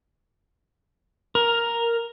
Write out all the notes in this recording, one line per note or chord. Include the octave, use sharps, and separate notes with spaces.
A#4